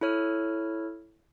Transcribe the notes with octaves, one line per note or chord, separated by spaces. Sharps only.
E4 A4 C#5 F6